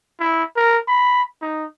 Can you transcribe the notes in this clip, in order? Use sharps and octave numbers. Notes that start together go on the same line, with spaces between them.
E4
A#4
B5
D#4